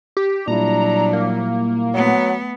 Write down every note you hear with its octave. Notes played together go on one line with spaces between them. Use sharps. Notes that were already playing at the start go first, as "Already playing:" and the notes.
G4
A#2 F#3 G3 D4 E4 A#5
A#3
F#3 A3 B3